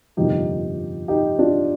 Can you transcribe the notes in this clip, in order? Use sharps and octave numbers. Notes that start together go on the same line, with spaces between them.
G1 F2 C3 F3 A#3 D#4 G4
D#4 G4
D4 F4